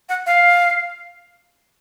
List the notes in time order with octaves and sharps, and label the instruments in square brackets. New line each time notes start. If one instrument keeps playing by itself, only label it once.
[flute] F#5
F5